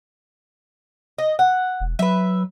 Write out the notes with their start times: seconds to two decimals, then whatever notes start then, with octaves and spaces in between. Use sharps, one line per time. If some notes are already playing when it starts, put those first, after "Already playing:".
1.18 D#5
1.39 F#5
1.80 E1
1.99 F#3 B4 E5